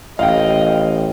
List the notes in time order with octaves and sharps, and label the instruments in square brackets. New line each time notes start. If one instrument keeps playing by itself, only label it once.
[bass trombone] A1 [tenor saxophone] D#5 [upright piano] F5 G5